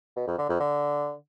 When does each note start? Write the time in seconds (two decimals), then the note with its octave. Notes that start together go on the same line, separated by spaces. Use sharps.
0.16 B2
0.27 F2
0.38 D3
0.49 F2
0.60 D3